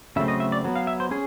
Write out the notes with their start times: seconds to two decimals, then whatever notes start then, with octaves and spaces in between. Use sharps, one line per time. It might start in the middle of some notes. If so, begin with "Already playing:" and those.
0.16 C#3 F#3 A3 C4 E5
0.28 D#5
0.40 E5
0.52 D5
0.65 F#3 B3
0.76 F5
0.87 E5
1.00 C5
1.11 C#4 G#4